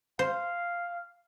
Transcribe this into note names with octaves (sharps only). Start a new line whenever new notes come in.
C5 F5